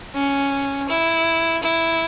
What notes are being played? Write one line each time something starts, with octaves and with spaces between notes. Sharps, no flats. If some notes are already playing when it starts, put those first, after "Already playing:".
C#4
E4
E4